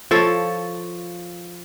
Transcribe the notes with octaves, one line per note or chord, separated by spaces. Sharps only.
F3 A4 C#5